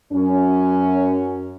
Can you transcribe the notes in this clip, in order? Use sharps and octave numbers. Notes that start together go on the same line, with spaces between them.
F#2 C#4